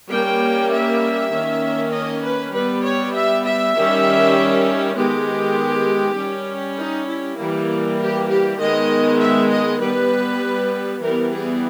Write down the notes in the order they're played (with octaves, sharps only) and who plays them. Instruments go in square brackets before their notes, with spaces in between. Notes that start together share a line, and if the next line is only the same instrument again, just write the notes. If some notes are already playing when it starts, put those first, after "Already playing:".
[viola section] G3 A#3 C#4 G5
E5
D#3 A#3 C#4
D#5
B4
G3 B3 B4
C#5
E5
E5
D#3 G3 C#4
D#3 G#3 B3 G4
G3 C#4
D#4
E4
E3 G3 A#3
G4
G4
D#3 G#3 B3 D#5
E5
D#5
G3 B3 B4
E3 G3 B3 A#4
G#4